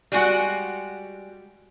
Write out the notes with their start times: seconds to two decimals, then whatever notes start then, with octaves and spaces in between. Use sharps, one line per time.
0.12 G3 G#3 F#4 F#5